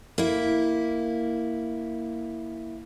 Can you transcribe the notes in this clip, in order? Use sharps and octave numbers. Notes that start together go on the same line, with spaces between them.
A#3 E4